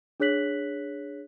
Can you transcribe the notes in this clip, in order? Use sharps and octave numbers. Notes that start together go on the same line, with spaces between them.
D4 G#4 C#5 F#6 B6 F#7